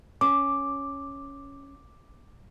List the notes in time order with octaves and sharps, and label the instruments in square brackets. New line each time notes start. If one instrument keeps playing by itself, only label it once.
[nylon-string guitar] C#4 [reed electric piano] D6